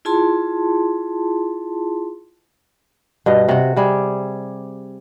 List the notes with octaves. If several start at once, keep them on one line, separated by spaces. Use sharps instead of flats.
E4 F4 G#4 A5 C6
G2 B2 D#5
C3 F#4
C3 G3 G#4